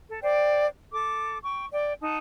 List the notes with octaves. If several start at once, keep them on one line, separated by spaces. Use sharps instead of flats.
A4
C5 D5 G5
A4 D6
G5 C#6
D5 G5
D#4 F#5 A5